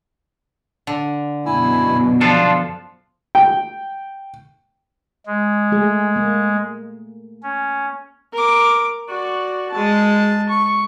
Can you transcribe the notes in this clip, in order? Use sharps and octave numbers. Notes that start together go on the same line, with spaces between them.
D3
F#2 B2 E4 G#5 E6
F3 D4 F4 F#4 A4
G5
G#3
A3 G#4
A#3
C#4
A#4 D6
F#4 D5
G#3 A5
C#6